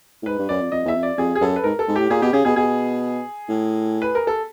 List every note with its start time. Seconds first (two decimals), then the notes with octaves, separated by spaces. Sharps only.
0.22 A2
0.26 G#2 B4
0.38 G2
0.49 F#2 D5
0.61 F2
0.72 F2 D#5
0.85 E2 E5
0.95 F2
1.03 D5
1.18 F2 G#4
1.35 G#4
1.41 F#2 A4
1.56 B4
1.64 G#2 A#4
1.79 A4
1.88 G#2
1.96 A2 G4
2.10 A#2 G#4
2.22 B2 G4
2.33 C#3 G#4
2.45 B2 G#4
2.56 B2 G#4
3.49 A2
4.02 B4
4.15 A#4
4.27 A4